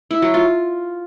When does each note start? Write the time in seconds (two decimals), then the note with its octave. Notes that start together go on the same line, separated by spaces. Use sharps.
0.11 E4
0.22 F#3
0.34 F4